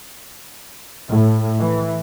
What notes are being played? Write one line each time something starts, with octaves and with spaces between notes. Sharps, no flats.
A2
E3